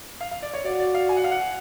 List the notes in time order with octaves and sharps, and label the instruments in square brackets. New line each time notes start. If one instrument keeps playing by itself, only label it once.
[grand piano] F5
F5
D5
C#5
[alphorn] F#4 [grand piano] D5
[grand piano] D5
F5
G#5
F#5
F5
F#5